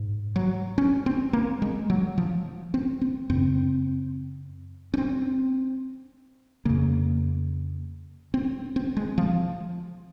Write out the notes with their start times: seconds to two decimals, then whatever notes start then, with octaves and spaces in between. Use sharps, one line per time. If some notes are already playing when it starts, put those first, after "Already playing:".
Already playing: G#2
0.36 F#3
0.78 C#4
1.06 C4
1.33 A#3
1.62 G#3
1.90 F#3
2.18 F3
2.74 C4
3.01 C4
3.30 F#2 C#3 C4
4.94 C#4
4.98 C4
6.65 F2 C#3 A#3
8.34 C4
8.76 C4
8.97 G#3
9.18 F3